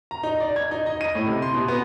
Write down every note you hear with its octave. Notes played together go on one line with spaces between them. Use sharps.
A#5
D#4
D5
G#6
D#4
D#5
D#7
A2
C3
C6
B2
B3